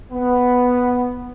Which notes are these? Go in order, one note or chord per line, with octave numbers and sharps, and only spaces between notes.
B3